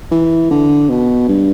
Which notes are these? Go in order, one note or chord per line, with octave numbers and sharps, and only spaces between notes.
E3
D3
B2
G2